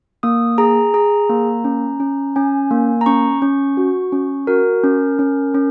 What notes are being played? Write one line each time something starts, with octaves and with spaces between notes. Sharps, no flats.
A#3 D#6
G#4 A#5
G#4 A#5
A#3
C#4
C#4
C#4 G#5
A#3
A#5
C#4 C#6
C#4
F#4
C#4
F#4 A#4
C#4
C#4
C#4